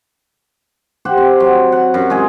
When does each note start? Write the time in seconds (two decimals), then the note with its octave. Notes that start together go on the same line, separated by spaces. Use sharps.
1.05 G4 C5 F#5
1.17 C4
1.40 F#3
1.72 F#5
1.94 F#2
2.10 G#3 F4 G#4